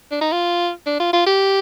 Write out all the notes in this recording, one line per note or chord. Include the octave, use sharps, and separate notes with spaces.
D4
D#4
F4
D4
F4
F4
G4